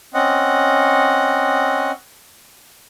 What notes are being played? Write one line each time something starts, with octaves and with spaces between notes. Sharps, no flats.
C4 C#4 D#5 F#5